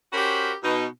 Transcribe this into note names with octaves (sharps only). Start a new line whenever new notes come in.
C#4 F#4 G4 A#4 C5 B5
B2 D#4